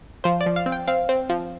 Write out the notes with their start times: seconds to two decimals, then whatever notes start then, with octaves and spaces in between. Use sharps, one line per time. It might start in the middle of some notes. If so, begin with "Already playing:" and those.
0.24 F3 C5
0.41 D5
0.46 F3
0.56 F5
0.66 C4
0.72 G5
0.88 C4 F5
1.09 C4
1.29 F3